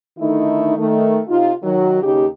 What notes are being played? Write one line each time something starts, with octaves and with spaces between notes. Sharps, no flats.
D3 D#3 A3 D#4 E4
D#3 A3
C3 D#4 F4
D#3 F#3
D#2 C#3 D#4 G4